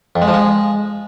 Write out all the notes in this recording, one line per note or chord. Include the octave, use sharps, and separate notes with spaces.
F2
G#3
F3
G#3